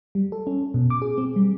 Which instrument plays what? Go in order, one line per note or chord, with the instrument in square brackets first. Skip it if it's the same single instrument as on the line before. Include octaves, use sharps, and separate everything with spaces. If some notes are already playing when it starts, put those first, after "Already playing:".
[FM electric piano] G3
A4
C#4
B2
D6
G#4
C4
G3